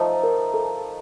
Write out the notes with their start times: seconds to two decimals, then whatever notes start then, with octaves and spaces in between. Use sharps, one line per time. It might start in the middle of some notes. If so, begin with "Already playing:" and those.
Already playing: F3 A3 D#4 C5
0.23 A#4
0.54 A4